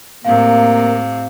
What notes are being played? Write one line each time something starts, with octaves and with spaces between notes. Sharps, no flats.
A2 C3 A#3 F5